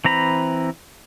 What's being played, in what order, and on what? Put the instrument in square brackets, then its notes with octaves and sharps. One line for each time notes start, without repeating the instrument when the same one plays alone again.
[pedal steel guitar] E3 C4 A#5 B5